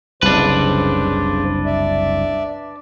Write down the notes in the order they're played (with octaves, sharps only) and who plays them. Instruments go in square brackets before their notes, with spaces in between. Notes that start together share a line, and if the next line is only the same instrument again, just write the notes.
[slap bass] F#1 C2 [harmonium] C#3 C5 [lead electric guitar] D4 B4
[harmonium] D5 E5